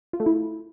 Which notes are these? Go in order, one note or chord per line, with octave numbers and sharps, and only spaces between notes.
F4
A3
E4